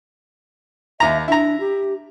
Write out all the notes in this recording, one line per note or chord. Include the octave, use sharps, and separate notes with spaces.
D#2 E5 A#5
D4 E4 A#5
G4